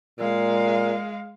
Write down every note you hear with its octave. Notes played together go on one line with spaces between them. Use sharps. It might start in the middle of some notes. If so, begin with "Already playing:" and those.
A#2 G#3 F5